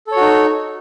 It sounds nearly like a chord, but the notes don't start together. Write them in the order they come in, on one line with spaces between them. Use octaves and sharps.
A4 C#5 F#4 D#4